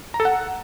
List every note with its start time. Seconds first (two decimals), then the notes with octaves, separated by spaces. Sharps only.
0.14 A#5
0.20 A4
0.25 F#5